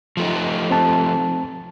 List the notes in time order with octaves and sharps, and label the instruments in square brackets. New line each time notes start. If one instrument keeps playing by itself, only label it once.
[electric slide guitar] F3 A3 D#4
[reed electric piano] C4 A5